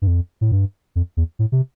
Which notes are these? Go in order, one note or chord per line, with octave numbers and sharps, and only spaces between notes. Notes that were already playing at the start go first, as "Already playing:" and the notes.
G2
F2
A2
G2
F2
E2
A2
C3